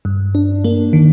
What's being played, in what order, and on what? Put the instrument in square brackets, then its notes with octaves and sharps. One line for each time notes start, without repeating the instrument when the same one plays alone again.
[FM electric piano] G2
D4
A#3
D#3